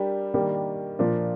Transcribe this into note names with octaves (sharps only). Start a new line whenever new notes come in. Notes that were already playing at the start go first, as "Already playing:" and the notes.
Already playing: G3 D4 G4 A#4
D#3 G3 A#3 D4
A#2 F3 A#3 D4 F4